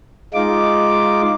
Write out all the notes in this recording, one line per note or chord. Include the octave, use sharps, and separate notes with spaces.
G#3 D#4 F4 D6